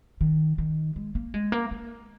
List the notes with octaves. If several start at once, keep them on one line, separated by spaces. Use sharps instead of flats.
D#3
D#3
G#3
A#3
G#3
A#3
A#3